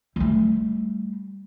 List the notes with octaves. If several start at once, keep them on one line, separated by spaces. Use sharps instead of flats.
G3 A3